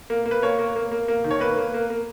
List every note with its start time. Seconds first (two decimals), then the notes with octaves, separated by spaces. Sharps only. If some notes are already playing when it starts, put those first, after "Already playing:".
0.10 A#3
0.26 A#3
0.31 B4
0.42 A#3 C#5
0.59 A#3
0.76 A#3
0.92 A#3
1.08 A#3
1.24 D#3
1.31 C#5
1.40 A#3 B4
1.57 A#3
1.74 A#3
1.90 A#3